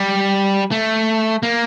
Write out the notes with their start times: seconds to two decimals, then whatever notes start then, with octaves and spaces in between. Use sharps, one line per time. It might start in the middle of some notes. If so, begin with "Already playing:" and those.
Already playing: G3
0.71 A3
1.43 A#3